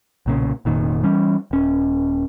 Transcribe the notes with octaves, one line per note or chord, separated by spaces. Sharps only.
B1 A#2 C#3
F1 A#2 D#3
E3 G3 C#4
D#1 C#4